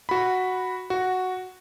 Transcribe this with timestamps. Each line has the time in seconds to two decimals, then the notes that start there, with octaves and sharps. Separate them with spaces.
0.09 F#4 B5
0.90 F#4